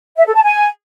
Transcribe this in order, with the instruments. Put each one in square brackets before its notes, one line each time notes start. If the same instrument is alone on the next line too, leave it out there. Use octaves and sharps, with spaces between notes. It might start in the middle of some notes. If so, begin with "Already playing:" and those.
[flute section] E5
A4
A5
G#5